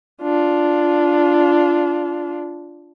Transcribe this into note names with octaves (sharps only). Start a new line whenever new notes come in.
D4 F4